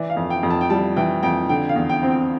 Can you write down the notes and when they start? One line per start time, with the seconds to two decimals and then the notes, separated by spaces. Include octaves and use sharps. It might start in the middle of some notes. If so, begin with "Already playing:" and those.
Already playing: E3 D5
0.10 F5
0.17 F2
0.30 G5
0.43 F2
0.50 A5
0.61 G5
0.70 G3 A5
0.96 E3 G5
1.23 F2 G5
1.49 D3 G5
1.69 F5
1.76 E2
1.89 G5
2.03 C4
2.10 G5